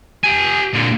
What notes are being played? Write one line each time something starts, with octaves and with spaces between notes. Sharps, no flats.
G4 G#5
A#2 D3